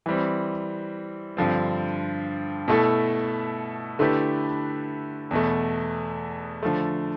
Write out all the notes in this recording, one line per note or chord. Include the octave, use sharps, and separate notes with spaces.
E3 G3 C4
G2 D3 F3 C4
B2 A3 E4 A4
D3 A3 E4 G4 B4
E2 B2 A3
D3 F3 A3